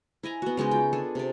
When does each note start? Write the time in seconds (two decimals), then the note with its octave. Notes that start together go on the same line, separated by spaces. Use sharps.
0.23 E4 D#5 G#5 A#5
0.42 B3 F#4
0.57 C#3 G#3 C#4 D#4
0.71 F4 G5
0.93 D4 G#4 A4
1.15 C3 D5